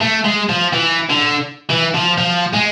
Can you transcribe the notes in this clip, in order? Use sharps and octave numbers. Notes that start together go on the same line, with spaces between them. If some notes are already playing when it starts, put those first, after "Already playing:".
A3
G#3
F3
E3
D3
E3
F3
F3
G#3